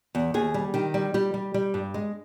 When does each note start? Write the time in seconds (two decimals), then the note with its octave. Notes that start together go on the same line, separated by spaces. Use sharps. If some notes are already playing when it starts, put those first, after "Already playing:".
0.15 E2
0.34 D#2 G#4
0.54 G3
0.74 D#3 G4
0.94 G3
1.14 G3 G4
1.34 G3
1.54 G3
1.74 G2
1.94 G#3